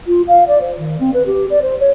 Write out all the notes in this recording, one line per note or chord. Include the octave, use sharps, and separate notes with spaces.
F4
F5
D5
C5
D#3
C4
B4
G4
D5
C5
C#5